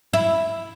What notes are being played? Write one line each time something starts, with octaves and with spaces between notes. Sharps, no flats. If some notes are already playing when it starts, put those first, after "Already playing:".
E4